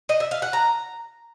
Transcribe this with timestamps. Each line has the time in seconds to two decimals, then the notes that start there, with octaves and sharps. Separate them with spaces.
0.09 D#5
0.20 E5
0.31 F5
0.42 F#5
0.53 A#5